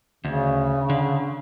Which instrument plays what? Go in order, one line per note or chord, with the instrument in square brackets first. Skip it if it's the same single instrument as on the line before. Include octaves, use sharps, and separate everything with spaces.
[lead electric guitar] D2 [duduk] C#3
[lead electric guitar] D3